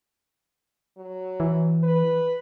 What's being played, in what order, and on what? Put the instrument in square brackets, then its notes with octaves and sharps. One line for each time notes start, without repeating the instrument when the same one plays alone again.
[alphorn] F#3
[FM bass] E3
[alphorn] B4